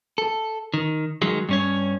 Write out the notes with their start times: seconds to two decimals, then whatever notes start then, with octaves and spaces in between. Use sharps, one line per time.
0.18 A4
0.74 D#3
1.22 D#3 F#3 G#3
1.49 G2 C#4 C#5